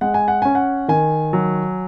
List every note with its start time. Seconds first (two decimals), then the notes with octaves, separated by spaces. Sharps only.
0.01 G#3 F#5
0.14 G#5
0.28 F#5
0.42 C#4 G#5
0.55 F#5
0.88 D#3 G#5
1.33 F#3